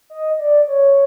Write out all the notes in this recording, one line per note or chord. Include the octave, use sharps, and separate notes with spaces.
D#5
D5
C#5